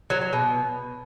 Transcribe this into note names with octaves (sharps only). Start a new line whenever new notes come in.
F#3
F#3
B2